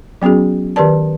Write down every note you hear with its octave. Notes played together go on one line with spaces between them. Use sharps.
F#3 B3 C#4 F#4 G#4
D#3 G4 A#4 B4 D5 A5